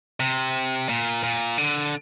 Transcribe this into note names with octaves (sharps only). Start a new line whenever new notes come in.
C3
A#2
A#2
D3